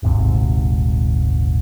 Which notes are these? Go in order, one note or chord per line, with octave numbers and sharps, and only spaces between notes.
D#1 G#1 G#2 C3